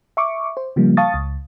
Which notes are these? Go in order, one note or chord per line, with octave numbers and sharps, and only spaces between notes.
E5 C#6 D6
C5
C#3 F3 G3 A#3
F5 A5 C#6 D#6 A6
C#2